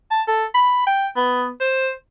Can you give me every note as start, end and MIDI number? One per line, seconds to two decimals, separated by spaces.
0.11 0.22 81
0.28 0.45 69
0.54 0.83 83
0.87 1.07 79
1.16 1.50 59
1.61 1.91 72